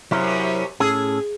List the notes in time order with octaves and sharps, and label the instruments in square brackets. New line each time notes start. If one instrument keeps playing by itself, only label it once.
[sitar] F#2 C3 [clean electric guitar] F#3 E4 A#4
[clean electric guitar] A2 C#4 A4 [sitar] G#4